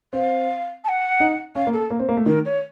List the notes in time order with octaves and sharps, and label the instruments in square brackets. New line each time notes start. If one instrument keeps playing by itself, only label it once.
[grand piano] C4 [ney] F5
[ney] A5
F#5
[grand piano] D#4
[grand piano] C#4 [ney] F5
[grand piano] A#3
[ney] A4
[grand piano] A#3
C4
A#3
A3
[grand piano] D#3 [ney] A#4
[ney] C#5